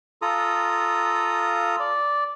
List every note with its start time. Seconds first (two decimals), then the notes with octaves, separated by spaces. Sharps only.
0.22 F4 A4 A#5 D#6
1.80 D5